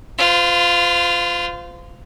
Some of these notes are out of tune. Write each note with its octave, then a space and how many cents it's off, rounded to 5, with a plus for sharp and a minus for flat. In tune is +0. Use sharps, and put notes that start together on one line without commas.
F4 +0 C5 -40